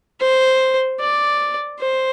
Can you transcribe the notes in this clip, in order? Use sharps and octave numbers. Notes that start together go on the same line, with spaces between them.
C5
D5
C5